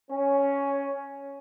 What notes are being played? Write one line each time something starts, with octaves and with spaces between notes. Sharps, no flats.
C#4